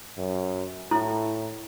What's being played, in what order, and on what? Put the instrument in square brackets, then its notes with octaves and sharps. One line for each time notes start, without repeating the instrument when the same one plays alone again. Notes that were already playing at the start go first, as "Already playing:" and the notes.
[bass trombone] F#2
[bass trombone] A2 [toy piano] E4